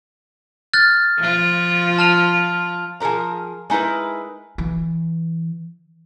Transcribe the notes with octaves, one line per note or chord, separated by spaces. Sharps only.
F6 F#6 A6
F3 F4
A5 F6 F7
F3 G#4 A#4 B4 A#5
G#3 D#4 E4 A#4 B4
E3